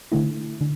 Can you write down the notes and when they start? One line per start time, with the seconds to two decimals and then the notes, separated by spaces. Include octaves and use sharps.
0.12 D3 A3 E4
0.61 D3